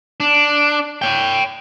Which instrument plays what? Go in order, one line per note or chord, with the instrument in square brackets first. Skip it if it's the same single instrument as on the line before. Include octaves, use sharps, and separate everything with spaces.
[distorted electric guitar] D4
C#5 G5